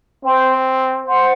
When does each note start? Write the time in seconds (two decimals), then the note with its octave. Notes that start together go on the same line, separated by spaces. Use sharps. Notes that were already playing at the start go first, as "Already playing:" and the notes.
0.24 C4 C5 G5 C6
1.05 C5 F#5 C6